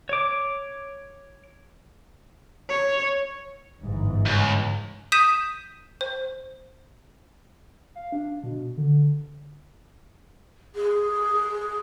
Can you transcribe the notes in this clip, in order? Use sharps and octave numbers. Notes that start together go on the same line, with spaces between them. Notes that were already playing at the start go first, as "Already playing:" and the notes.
C#5 D6
C#5
G1 G#2 E3
C#2
D#6 G6 B6 D#7 E7
C5
F5
D4
B2
D3
G#4